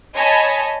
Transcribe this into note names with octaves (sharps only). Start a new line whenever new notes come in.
C#5 D#5 G#5 A5 B5 D#6